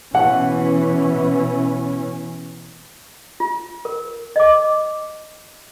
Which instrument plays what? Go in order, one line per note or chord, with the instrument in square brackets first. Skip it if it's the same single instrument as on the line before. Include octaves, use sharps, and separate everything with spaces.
[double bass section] B2 E3 C#4 [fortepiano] F#5
[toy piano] F4
A#4
D#5 D6